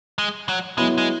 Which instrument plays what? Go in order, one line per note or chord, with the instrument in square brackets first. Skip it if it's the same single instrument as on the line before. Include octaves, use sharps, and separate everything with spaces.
[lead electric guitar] G#3
F#3
[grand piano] F#3 B3 E4 [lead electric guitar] G#3
[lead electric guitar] G#3